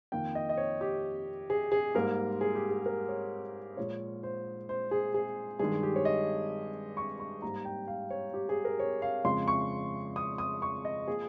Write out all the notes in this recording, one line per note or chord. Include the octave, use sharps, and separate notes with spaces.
F2 D#3 A#3 G5
D#5
D#5
C#5
G4
G#4
G#4
G#2 G3 A#3 A#4
G#4
G4
G#4
A#4
C#5
A#2 F3 G#3 C#5
C5
C5
G#4
G#4
G2 D#3 G#3 G#4
G4
C#5
D#5
C#6
C#6
G#2 G3 A#3 A#5
G5
F5
C#5
G4
G#4
A#4
C#5
F5
F2 C#3 G#3 C6
C#6
D#6
D#6
C#6
D#5
F3 A#3 G#4